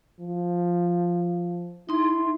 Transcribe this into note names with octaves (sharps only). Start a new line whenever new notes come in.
F3
D#4 E4 C6